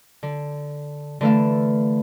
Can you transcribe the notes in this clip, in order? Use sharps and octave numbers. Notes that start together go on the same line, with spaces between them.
D3
D3 E3 A3 E5 F5